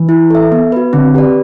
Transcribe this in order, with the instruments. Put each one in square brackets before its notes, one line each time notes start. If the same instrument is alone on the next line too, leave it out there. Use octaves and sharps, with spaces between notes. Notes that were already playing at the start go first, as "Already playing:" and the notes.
Already playing: [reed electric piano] E3
[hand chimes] E4
A4 E5
B3
F#4 B4
[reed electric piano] D3 [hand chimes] C4
[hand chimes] G4 B4 D5